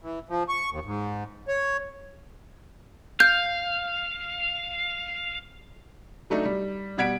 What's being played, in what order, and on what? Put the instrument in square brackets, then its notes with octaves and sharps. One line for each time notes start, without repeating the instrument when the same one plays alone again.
[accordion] E3
F3
C#6
D#2
G#2
C#5
[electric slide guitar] F5 [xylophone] G6
[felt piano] F#3 A3 D4 D#4
G3
B2 G3 F#5 G#6 B6 D7